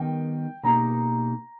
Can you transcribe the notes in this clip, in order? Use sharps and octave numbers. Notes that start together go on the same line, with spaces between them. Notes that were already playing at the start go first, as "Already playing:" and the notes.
Already playing: D#3 G3 B3 D#4 A#4 G5
B2 A#3 D#4 G4 A#5